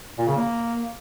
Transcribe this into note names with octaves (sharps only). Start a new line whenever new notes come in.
A#2
C#3
A#3